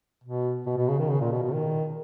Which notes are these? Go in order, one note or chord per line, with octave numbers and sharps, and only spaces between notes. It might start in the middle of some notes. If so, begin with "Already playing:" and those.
B2
B2
B2
C#3
D#3
C#3
A#2
B2
B2
D#3